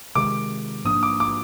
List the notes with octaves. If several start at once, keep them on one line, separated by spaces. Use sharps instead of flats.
C3 D#3 G#3 D6
G#2 F3 A#3 D4 D#6
D6
D6